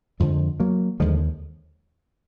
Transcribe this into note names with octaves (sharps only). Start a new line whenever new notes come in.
F2 D3 F3 G#3
F#3 A#3
D#2 D3 F3 G#3